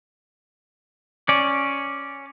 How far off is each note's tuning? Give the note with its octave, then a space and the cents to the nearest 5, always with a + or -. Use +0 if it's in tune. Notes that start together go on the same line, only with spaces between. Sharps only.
C#4 +0 D5 +0